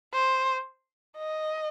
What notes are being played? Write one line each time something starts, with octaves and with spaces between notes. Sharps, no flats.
C5
D#5